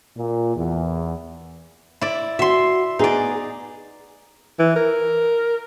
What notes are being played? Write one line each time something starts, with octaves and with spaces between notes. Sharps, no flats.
A#2
E2
E4 D5
F#4 E5 C6
B3 D#4 G#4 D5
E3
A#4